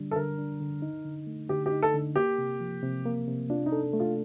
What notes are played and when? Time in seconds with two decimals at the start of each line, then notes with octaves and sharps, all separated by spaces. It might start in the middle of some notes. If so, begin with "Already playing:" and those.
Already playing: D3 G3 D4
0.11 A4
0.16 D3 A#4
0.38 D4
0.61 D3
0.82 D#4
1.05 D3
1.27 A3
1.49 D3 G4
1.66 G4
1.72 D#4
1.83 A4
1.94 D3
2.16 A#3 G4
2.38 C3
2.60 F3
2.83 C3
3.05 A#3
3.28 C3
3.50 D4 F4
3.66 D#4
3.72 A4
3.93 A3
4.00 F4